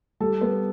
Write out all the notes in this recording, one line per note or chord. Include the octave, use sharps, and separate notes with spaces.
G3 A4
B3